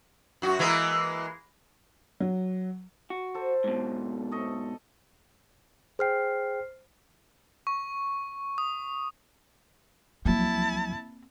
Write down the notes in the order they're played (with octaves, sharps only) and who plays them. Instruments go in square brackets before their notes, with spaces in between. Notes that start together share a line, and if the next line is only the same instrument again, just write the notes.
[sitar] F#2 F#4
E3 G#3 A#3
[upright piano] F#3
[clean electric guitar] F#4
[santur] A4 C5
[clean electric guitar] G#2 B2
[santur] A3 A4 D#5
[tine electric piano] G#4 G5 [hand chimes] C5 F6 C7
[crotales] C#6
D#6
[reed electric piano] C#2 F3 F#3 [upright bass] A#3 C4 [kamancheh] E4 A5